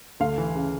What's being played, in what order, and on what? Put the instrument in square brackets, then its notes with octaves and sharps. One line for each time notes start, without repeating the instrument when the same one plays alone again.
[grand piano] D2 F5
E3
C#3